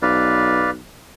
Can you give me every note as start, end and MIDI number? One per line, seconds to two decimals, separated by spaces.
0.02 0.80 35
0.02 0.70 71
0.02 0.70 74
0.02 0.70 77